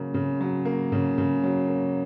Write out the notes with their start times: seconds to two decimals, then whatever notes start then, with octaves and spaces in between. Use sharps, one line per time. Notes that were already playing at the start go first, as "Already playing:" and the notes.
Already playing: C#3 F#3 A#3
0.14 C#3
0.41 F#3
0.65 A#3
0.92 C#3
1.18 C#3
1.43 F#3
1.68 A#3